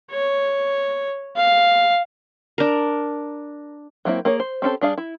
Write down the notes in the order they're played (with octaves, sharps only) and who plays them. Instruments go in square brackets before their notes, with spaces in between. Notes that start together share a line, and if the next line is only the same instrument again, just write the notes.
[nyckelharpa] C#5
F5
[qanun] D4 A#4
[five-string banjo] F#3 A#3 C4 E4
A#3 G#4 C#5
C5
C4 C#4 G4 A4 C5
G3 D4 G#4 F5
E4